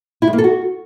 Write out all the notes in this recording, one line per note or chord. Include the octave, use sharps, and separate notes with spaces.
E4
G#3
A#3
A4
F#4